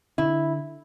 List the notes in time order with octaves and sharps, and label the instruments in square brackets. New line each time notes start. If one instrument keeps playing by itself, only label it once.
[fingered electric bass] D3 [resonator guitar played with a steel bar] E4